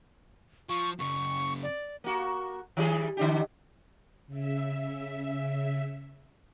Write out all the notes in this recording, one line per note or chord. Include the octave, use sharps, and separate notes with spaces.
F3 C#6
F#2 C#3 C#6
D5
A#3 F#4
D#3 G3 G#4
D3 D4 G4
C#3 E5